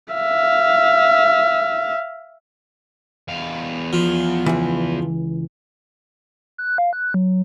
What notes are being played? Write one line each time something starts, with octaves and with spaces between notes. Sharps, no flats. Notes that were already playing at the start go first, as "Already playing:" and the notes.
E5 F5
E2 F5
F3
C#2 E3
F#6
F5
F#6
F#3